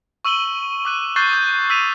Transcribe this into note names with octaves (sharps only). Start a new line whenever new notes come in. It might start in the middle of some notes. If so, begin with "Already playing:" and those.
C#6 E6 D#7 F#7 G7
D6 F#6 D#7
C#6 F#6 G6 A6 C7 G7
D#6 G6
E6 B6 D#7 F7